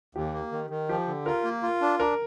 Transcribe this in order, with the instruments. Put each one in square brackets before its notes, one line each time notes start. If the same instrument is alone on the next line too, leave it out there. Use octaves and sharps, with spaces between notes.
[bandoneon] D#2 [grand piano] G4
[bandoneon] A#3
D#3
D#3
[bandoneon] F3 [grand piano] G4
[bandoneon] D3
[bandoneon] F4 [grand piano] A#4
[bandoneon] A#3
F4
D4
[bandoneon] D4 [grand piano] A#4